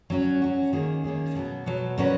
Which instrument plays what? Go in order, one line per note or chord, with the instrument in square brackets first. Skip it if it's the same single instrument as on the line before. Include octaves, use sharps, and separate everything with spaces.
[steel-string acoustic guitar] F#3 C#4 F#4
F#3 C#4 F#4
D#3 A#3 C#4 G#4
D#3 A#3 C#4 G#4
B2 F#3 B3
B2 F#3 B3
A#2 F#3 C#4 F#4 B4